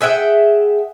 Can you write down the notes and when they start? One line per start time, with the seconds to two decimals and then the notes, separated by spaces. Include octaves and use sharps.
0.01 G#4 E5 F#5 G5